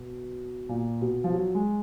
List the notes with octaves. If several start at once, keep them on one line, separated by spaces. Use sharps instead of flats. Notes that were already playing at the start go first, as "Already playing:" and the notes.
Already playing: B2
A#2
B2
F3
F#3
G#3